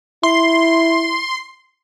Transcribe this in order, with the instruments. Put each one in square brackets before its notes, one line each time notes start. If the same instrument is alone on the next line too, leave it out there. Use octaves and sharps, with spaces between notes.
[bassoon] E4 [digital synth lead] C6